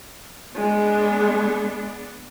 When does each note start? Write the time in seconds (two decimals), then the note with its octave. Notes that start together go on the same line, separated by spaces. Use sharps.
0.55 G#3 B3 D4